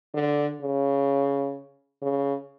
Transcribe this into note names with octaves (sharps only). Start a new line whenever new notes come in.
D3
C#3
C#3